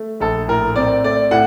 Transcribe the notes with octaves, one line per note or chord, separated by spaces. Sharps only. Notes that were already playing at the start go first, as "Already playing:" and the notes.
Already playing: A3
A#1 A4
A2 A#4
C4 D5
A3 D5
A2 F#5